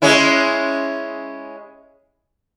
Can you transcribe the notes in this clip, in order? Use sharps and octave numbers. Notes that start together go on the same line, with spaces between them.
G#3 C#4 E4